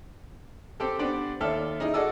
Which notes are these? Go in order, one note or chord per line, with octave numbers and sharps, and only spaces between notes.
C4 G4 A4
B3 C4 D4 G4
D#2 A4 D5 E5 F6
D#4 E4 G#4 D#5
F#4 G#4 A4 D5 D#5 E6